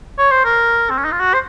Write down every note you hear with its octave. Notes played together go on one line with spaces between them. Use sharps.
C#5
C5
A#4
C4
C#4
D#4
F4
F#4
C5